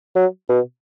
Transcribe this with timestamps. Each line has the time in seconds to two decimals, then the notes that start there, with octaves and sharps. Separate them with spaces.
0.16 F#3
0.49 B2